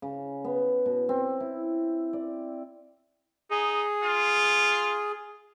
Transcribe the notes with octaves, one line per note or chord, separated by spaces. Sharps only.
C#3
B3
B2
C4
E4
D5
D#4 G#4
F4